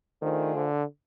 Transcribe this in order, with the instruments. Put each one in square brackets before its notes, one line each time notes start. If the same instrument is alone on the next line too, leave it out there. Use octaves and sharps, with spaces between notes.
[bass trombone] D#3 [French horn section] A3 D4 F4 G#4 C5
[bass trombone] D3